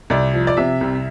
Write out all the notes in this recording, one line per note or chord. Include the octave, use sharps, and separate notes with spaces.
C2 D5
F3
D5
C3 E5
C2